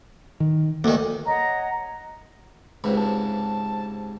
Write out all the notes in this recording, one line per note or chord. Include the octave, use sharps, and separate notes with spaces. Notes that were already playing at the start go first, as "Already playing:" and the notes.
D#3
D2 D#3 A#3
C#5 D#5 F#5 A#5
C#2 G#2 C3 B4
A5